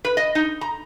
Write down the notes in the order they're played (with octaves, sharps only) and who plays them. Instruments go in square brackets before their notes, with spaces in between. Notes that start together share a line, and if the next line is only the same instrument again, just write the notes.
[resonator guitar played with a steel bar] B4
D#5
D#4
A#5